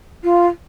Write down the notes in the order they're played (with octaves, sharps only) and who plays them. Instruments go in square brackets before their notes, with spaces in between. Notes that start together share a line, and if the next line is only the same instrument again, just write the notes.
[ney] F4